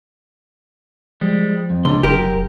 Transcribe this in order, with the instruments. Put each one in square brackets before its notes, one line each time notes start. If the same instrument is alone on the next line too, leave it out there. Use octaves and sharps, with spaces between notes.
[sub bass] F3 [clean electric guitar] G3 G#3
[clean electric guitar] F2
[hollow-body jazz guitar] C#2 [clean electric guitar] D4 C6
[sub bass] F1 [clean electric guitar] C#2 F#2 [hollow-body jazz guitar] G4 A#4